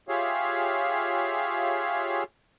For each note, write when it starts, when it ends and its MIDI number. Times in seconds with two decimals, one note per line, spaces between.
0.09 2.23 65
0.09 2.23 67
0.09 2.23 68
0.09 2.23 73
0.09 2.23 76
0.09 2.23 77